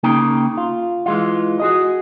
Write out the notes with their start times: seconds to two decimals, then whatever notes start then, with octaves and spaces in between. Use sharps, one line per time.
0.03 C#3 A#3 D#4 G5
0.57 F4
1.06 E3 G#3 F4
1.60 F#4 G#4 D#5